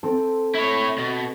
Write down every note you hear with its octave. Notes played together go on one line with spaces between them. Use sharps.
C4 A4
E4 C#5
B2